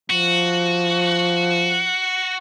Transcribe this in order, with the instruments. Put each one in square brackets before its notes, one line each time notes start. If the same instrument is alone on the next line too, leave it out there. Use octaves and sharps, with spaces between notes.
[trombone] F3 [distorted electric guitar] F#4